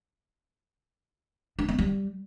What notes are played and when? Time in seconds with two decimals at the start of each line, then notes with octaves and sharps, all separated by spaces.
1.59 D4
1.69 B3
1.79 G3